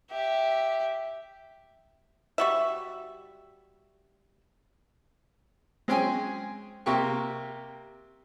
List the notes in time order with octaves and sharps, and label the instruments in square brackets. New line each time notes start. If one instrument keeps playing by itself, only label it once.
[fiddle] G4 E5
[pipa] G3 F#4 E5
[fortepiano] G#3 C4 C#4 G#4 G5 G#5
C3 A#3 G4 C#6